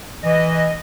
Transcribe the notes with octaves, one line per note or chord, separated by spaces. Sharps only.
E3 D#5